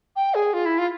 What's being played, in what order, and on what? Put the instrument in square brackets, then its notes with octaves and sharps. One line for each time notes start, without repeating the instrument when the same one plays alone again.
[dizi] G5
G#4
F4
E4
F4